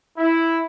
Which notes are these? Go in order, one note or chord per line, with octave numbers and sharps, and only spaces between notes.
E4